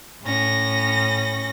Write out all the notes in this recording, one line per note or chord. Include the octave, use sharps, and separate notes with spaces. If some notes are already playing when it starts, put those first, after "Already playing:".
A2 C#4 A#6